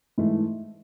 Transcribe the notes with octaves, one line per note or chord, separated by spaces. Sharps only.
G#2 E3 A3